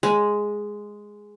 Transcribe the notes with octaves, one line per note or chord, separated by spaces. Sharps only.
G#3